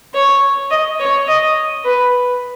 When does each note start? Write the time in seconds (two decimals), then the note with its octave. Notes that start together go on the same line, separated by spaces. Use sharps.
0.14 C#5
0.71 D#5
0.99 C#5
1.28 D#5
1.84 B4